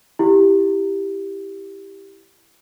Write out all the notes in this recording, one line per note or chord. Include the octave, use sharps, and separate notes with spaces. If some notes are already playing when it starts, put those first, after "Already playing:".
E4 G4